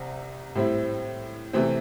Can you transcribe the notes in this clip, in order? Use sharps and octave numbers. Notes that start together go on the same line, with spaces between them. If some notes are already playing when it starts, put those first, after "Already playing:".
Already playing: C2 C3 C4
A2 G3 C4 E4
C3 E3 A3 C4